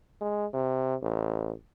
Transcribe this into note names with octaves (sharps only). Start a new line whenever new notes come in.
G#3
C3
A1